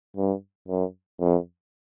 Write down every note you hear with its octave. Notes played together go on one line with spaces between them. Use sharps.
G2
F#2
F2